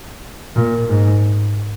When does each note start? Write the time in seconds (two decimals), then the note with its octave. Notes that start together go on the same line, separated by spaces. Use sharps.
0.56 A#2
0.89 G#2